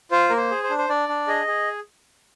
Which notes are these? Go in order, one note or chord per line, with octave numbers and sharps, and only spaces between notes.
F4 C5
A#3 A#4
C5
G#4
C5
D4
C5
D4 D5
D4
G#4 D#5
G#4